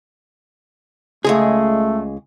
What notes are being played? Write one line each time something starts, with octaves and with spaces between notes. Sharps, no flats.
C#2 G#3 A3 G#4